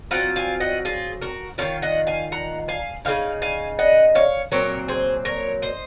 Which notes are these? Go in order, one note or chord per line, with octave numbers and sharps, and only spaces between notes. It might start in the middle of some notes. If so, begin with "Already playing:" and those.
F#3 C4 F4 F#5 A#5
F5 G#5
D#5 F#5
F4 G#4
F#4 A#4
D#3 A#3 F4 C#5 F5
D#5 F#5
F5 G#5
F#5 A#5
F5 G#5
C#3 G#3 D#4 F5 G#5
F5 G#5
D#5 F#5
C#5 F5
A#2 F#3 C4 A#4 C#5
G#4 C5
A#4 C#5
C5 D#5